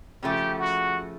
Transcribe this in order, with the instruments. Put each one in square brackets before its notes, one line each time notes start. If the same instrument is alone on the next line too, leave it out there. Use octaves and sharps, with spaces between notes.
[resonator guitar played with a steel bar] C#3 F3 A3 [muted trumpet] G4
[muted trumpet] F#4